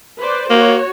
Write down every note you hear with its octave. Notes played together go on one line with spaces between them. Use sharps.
B4 C5 D5
A#3 F#4 C#5